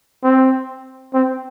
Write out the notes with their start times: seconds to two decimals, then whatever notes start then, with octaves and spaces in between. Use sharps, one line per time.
0.24 C4
1.14 C4